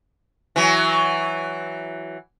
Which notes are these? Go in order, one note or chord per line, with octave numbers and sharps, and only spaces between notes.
E3 F#3